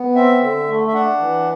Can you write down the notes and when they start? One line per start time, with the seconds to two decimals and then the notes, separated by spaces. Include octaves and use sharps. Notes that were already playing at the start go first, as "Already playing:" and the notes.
Already playing: B3
0.15 C4 E5
0.42 D3
0.68 A3
0.87 E5
0.93 D4 F#5
1.20 E3